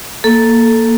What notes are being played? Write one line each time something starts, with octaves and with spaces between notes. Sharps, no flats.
A#3 A4